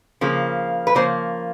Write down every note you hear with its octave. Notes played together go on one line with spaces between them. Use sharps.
C#3 F3 A#3
B4
C#3 F3 A#3 C5